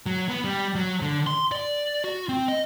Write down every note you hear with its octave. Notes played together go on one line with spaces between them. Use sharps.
F#3
B3
G3
F#3
D3
C6
D5
F#4
C4
D#5